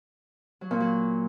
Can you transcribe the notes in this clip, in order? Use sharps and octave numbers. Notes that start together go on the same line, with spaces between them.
F#3
A#2
F#3